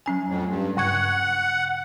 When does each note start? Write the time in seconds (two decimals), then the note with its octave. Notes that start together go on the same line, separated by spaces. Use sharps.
0.06 F#3 C#4 G#5
0.28 F2 A2
0.49 G2
0.77 G2 C#3 F#5 G#6